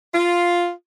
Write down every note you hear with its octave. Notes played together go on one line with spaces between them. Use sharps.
F4